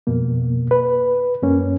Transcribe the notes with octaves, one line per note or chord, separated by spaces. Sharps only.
F2 B2 A#3
B4
F#2 A#3 C#4